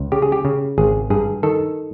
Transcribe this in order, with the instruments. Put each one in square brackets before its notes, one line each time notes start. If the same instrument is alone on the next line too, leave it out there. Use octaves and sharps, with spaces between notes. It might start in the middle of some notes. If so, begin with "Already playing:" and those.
Already playing: [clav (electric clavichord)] C#2
C#3 G4
G#4
G4
C#3
G#1 G#4
G2 G#4
D#3 A4